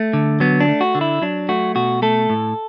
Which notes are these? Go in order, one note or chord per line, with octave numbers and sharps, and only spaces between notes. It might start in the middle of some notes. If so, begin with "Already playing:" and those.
Already playing: A3
D3
F#3 B3
D4
A3
F#4
D3
E4
F#3 D4
A3 F#4
B2 F#4
A3 A4
A2